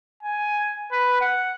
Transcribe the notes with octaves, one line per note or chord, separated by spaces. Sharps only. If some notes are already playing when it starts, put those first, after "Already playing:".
G#5
B4
F#5